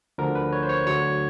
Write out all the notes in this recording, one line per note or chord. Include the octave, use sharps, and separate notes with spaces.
D2 D3 F3 A#4
B4
C#5
C5
C#5
D2 D3 F#3 C#5